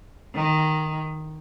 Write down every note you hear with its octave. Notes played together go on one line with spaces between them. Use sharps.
D#3